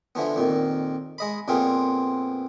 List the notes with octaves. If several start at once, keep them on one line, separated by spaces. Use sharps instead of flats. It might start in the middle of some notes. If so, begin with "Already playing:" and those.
D3 E3 F3 B3
F2 A#2 D#3
G#3 D#5 B5
F2 A#2 B3 C4 F4 G#4